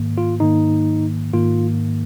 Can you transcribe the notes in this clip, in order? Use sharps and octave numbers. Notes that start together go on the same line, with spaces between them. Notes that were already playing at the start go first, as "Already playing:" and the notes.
Already playing: G#2 D#3 A#3
F4
G#2 D#3 A#3 D#4
G#2 D#3 A#3 F4